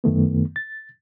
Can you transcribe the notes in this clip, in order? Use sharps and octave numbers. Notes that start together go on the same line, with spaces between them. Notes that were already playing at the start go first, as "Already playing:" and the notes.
F#2 D#3 A3 B3
A6